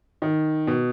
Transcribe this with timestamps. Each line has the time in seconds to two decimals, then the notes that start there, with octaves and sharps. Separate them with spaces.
0.22 D#3
0.67 B2